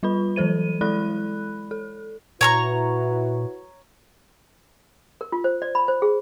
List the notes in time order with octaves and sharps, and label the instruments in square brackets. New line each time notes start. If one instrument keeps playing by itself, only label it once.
[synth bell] G3 F4 B4 B5
E3 F#3 A4 C5 D#7
G#3 E4 A4 D5 B5 F#6
A4
[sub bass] A#2 [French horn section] E4 F#4 B4 [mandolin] C#5 A#5 C#6
[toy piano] A#4
F4
C5
D5
B5
C5
G#4